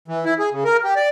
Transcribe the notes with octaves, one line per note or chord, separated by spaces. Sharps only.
E3
E4
G#4
C#3
A#4
G4
D5